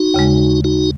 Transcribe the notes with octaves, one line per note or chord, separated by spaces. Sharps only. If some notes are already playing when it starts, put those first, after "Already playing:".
Already playing: D#4 F#4
D#2 C#3 G#3
D#4 F#4